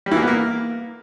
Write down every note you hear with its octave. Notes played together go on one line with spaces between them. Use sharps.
G3
E3
A#3
B3
A#3